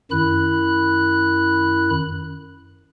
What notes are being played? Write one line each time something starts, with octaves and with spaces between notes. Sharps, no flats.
F#2 D#3 E4 B5 F#6